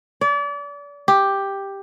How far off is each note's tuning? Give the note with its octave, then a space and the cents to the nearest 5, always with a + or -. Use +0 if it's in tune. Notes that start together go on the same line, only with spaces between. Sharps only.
D5 -35
G4 +5